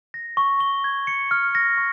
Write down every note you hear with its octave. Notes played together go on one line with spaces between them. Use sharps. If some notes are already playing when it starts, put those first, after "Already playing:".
A#6
C#6
G7
G#6
C#7
F6
A#6
C#6